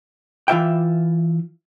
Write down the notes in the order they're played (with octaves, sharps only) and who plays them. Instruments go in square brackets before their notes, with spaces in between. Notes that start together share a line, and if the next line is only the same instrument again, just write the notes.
[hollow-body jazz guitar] E3 F4 E5 G5